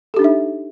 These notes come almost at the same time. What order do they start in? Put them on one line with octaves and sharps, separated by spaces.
A4 G4 D4 D#4 E5